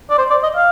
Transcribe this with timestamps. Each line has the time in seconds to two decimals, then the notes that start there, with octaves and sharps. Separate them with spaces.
0.10 D5
0.18 C5
0.30 D5
0.43 D#5
0.56 F5